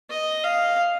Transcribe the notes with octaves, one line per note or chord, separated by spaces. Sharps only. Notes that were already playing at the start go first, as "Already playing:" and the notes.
D#5
F5